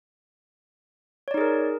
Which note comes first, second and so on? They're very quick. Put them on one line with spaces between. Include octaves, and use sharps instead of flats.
C#5 D5 D#4 G#4 A#4